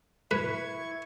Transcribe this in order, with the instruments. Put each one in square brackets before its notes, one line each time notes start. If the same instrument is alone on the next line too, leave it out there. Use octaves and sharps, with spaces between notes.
[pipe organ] E4 C#6 G#6 [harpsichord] B4